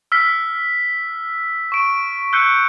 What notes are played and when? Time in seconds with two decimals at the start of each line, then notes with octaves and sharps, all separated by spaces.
0.12 E6 F6 B6
1.72 C#6 D7
2.33 E6 F#6 G6 C7 C#7 D#7